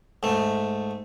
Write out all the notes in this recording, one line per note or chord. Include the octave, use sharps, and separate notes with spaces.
G#2 A3